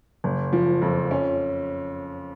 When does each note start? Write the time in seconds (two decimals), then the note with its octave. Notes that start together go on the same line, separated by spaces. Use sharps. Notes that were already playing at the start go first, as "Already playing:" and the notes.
0.24 F#1
0.53 F3
0.82 F2
1.11 C#4